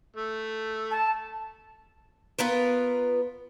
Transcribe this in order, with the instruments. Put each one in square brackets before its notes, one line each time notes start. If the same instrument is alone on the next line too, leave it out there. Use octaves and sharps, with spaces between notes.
[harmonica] A3
[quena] A5
[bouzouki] B3 F4 A#4 B4